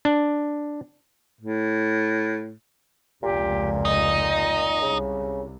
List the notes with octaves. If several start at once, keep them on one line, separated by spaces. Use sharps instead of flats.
D4
A2
F1 C#2 A#2 G4
D#4 D#5
C2 C#3